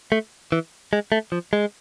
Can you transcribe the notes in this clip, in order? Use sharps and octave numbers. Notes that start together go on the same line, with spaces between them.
A3
E3
G#3
A3
F3
G#3